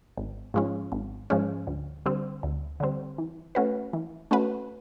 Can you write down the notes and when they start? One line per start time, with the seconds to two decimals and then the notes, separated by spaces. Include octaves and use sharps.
0.17 G#1
0.54 G#2 F3 G#3 C#4
0.92 G#1
1.30 G#2 F3 G#3 C#4
1.67 D2
2.06 D3 G3 C4
2.43 D2
2.80 D3 G3 C4
3.18 E3
3.55 A3 C#4 F#4 B4
3.93 E3
4.31 A3 C#4 F#4 B4